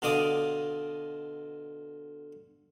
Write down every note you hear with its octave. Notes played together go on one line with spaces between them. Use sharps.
B2 D3 F4 D5 D6 D#6